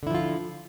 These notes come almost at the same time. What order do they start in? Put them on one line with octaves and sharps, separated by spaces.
D3 E4 F3 F4